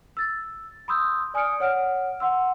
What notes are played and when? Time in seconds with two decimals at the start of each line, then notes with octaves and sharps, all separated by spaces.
0.17 E6 A6
0.88 B5 C6 D#6 E6 G6
1.34 D5 G#5 D#6 F6 C#7 D7
1.60 C#5 F#5 F6 D7
2.20 F#5 C6 E6